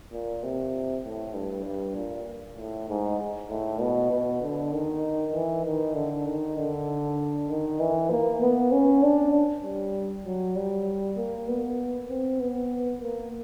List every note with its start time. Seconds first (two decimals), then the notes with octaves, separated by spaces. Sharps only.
0.12 A#2
0.43 C3
1.05 A2
1.34 G2
1.65 G2
1.96 A#2
2.58 A2
2.89 G#2
3.50 A2
3.80 B2
4.11 B2
4.42 D3
4.73 D#3
5.34 E3
5.65 D#3
5.95 D3
6.26 D#3
6.58 D3
7.49 D#3
7.80 E3
8.11 A#3
8.42 B3
8.72 C#4
9.03 D4
9.64 G3
10.26 F#3
10.56 G3
11.17 A#3
11.48 B3
12.09 C4
12.40 B3
13.01 A#3